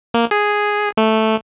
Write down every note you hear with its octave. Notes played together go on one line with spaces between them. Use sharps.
A#3
G#4
A3